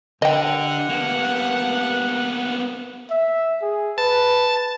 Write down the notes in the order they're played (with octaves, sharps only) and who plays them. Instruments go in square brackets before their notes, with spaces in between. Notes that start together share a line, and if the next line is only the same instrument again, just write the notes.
[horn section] G2 F#5 [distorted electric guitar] D3 [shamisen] D#5 G5
[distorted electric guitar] A#3 B3
[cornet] E5
G#4
[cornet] B4 [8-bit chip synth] A5